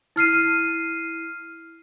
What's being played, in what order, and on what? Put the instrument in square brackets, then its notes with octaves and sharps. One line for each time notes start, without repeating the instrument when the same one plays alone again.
[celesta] E4 F6 C7 D#7